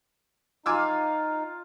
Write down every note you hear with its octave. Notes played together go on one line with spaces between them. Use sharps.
D#4 F4 F5 G#5 D6 E6